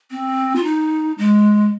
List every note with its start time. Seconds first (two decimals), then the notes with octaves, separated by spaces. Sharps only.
0.11 C4
0.56 F4
0.64 D#4
1.18 G#3